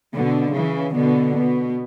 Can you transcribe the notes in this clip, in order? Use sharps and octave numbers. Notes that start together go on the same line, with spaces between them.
B2 D3
C#3 E3
B2 D3
B2